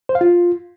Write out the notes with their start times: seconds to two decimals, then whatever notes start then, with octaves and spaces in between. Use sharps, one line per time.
0.09 C5
0.15 F5
0.21 F4